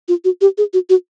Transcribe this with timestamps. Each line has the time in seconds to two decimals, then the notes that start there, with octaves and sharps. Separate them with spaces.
0.08 F4
0.24 F#4
0.41 G4
0.58 G#4
0.73 F#4
0.89 F#4